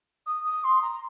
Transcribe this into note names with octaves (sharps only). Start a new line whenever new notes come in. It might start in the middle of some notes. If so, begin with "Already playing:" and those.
D#6
D#6
C6
A#5